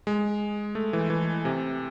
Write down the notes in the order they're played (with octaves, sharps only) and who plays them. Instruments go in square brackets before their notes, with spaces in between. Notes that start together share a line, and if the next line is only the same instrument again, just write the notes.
[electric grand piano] G#3
A3
E3
E3
C3